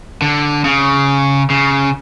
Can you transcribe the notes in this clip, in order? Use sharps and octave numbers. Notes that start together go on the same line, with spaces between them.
D3
C#3
C#3